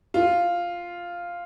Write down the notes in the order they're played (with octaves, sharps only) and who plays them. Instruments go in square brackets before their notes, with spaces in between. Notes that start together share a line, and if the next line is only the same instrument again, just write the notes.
[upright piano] F4